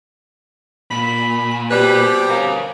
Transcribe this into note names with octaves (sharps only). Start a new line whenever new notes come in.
A#2 B5
B2 G3 C4 G4 B4
A#4 C#5 F5